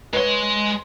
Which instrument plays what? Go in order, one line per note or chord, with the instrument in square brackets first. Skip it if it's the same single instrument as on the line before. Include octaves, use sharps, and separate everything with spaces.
[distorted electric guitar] G#3 C6 [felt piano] B4 C#5